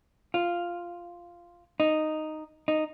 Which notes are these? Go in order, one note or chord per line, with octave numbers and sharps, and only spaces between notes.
F4
D#4
D#4